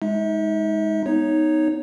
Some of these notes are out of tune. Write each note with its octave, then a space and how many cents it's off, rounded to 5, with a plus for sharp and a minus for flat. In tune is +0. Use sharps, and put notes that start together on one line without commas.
G#3 +0 D#4 +20 E5 -35
B3 +0 D#4 +0 C#5 +0